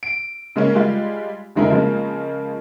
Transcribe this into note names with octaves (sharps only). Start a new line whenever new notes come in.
D7
C#3 G#3 A#3 C#4
G3 G#3 F4
F1 D3 G#3 D#4 E4 A#4
C#3 F3 G#3 A#3